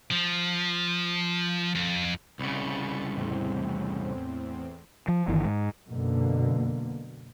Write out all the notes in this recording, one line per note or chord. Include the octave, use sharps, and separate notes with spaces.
F3
F2
C2 C#3 B5 A6 C#7
E2 A2 C4
F3
G1 D#3 E3
G#2
F#2 B2 D3 A#3